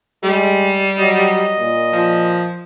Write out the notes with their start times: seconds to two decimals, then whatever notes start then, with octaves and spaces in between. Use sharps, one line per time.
0.23 G3 G#3
0.99 F#3 D#5
1.59 A#2
1.93 F3